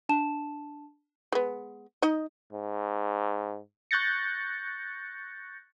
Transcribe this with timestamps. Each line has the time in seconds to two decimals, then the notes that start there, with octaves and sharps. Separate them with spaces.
0.09 D4 A5 E7
1.32 G#3 B3
2.02 D#4 D#5
2.53 G#2
3.91 C#6 F#6 G6 A6 A#6 C#7